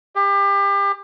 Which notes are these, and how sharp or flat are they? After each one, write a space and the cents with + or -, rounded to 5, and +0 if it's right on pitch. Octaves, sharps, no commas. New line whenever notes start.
G4 +30